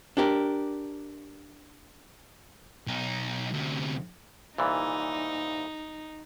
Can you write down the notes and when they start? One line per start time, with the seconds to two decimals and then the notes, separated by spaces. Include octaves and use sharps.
0.17 D4 G4 A#4
2.87 B1 D#4
3.54 D2 C3
4.58 C2 A#2 E3 D#4